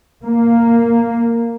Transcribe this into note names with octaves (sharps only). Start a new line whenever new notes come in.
A#3